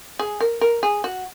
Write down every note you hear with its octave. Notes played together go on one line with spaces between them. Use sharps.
G#4
A#4
A#4
G#4
F#4